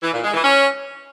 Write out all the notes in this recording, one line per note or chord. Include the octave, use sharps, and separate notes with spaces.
E3
A#2
G#3
E3
C#4